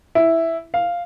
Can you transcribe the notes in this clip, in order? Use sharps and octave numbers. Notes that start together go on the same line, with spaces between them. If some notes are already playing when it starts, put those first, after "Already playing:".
E4
F5